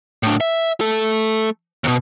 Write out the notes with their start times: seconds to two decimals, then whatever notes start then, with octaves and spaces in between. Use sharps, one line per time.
0.23 A2 D4
0.41 E5
0.81 A3 A4
1.84 D#2 B2